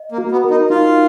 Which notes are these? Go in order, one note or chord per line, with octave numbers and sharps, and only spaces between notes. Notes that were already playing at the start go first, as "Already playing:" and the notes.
Already playing: D#5
A#3
F#4
B3
A#4
D#4
D#4 F4